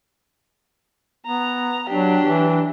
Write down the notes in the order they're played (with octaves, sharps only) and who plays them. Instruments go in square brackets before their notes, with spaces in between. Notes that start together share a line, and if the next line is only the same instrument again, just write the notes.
[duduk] B3 [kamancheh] A#5
[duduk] F#3 [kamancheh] D4 G4
[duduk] E3